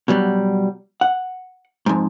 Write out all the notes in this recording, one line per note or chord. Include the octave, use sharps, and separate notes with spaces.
B2 F#3 G3
F#5
F2 G#2